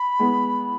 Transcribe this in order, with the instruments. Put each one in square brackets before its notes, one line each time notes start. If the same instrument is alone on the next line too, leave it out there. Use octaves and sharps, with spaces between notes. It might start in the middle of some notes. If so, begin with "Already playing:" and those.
Already playing: [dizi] B5
[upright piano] G#3 B3